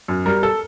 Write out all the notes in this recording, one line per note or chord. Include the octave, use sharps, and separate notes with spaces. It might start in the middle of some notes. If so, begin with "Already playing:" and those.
F#2
G3 A#4
A4